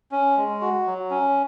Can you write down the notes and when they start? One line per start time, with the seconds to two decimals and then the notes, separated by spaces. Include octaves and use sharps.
0.12 C#4
0.37 G#3
0.61 F#4
0.87 F#3
1.10 C#4